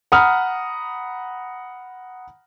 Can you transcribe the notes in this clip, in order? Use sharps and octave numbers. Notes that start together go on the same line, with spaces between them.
F#5 A#5 B5 D#6 F6